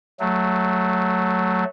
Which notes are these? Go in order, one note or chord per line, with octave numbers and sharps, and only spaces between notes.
F#3 A3